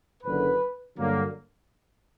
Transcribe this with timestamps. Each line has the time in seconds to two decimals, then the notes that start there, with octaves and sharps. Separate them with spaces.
0.23 F#1 F#2 D3 B4
0.97 G2 D3 F#3 A#3